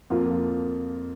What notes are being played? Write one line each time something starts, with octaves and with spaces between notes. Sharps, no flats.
F2 F3 A#3 F4